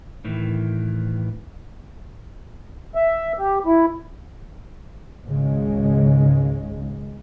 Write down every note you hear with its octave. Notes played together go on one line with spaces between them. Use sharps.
A2 D#3 E3
E5
G4
E4
G#1 C#2 C#3 G#3